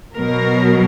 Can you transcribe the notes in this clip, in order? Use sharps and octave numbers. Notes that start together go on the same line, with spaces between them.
B2 F#3 A#4